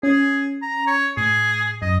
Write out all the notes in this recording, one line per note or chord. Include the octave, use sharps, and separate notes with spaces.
C#4 G#4
A#5
C#5
A2 G#4
F#2 D#5